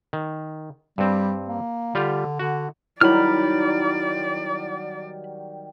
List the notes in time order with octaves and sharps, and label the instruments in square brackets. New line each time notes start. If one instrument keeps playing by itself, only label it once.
[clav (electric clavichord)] D#3
[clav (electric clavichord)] G2 C4 [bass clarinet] G3
[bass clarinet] A#3
[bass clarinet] D3 [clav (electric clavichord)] G3 F4 G4
[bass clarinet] D3 [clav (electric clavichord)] F#4
[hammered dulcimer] D#3 F#3 G3 [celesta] E4 [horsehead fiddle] D5 [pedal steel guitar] B5 F6